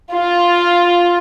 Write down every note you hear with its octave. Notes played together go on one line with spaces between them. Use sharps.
F4